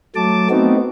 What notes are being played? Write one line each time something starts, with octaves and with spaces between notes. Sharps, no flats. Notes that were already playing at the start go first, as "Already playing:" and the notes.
F#3 A3 A5 D6
A3 B3 C4 D#4 F#4